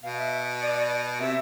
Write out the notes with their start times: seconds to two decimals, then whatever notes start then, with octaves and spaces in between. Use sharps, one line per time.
0.03 B2 F5
0.18 E5
0.62 D5
1.20 C3 E5